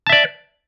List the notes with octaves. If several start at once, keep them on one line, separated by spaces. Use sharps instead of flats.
D5 E5 A5